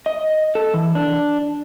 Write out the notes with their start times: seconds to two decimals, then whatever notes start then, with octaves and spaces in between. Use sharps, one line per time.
0.06 D#5
0.55 A4
0.74 E3
0.95 D4